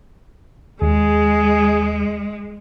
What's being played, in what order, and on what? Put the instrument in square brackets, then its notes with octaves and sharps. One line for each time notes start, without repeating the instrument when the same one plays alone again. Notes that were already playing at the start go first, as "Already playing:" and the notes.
[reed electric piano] D#2 [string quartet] G#3 [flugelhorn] G#4